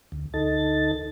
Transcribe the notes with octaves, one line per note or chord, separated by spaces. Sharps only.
D2
D2 D#4 A4 A6